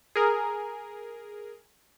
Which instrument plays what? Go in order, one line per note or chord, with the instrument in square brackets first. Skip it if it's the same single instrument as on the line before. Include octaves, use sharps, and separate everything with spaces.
[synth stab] G#4 A#4